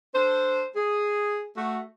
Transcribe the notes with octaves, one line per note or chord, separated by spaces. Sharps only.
D4 A4 C5
G#4
A3 F#4